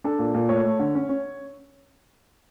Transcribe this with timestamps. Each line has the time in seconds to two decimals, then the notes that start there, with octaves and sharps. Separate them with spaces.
0.04 D4 A4
0.19 A#2
0.34 A#2
0.49 A3 C#5
0.65 A3
0.79 D3
0.95 C#4
1.09 C#4